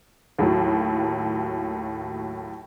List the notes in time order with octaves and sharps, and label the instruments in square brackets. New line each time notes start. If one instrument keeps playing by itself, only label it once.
[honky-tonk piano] D#2 A2 F#3